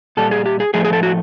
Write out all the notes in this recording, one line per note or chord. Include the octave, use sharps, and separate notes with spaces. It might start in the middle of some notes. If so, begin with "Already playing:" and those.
A#2 G3 A4
G#4
G4
G#4
A2 F3 A3 G#4
G#4
A4
F#4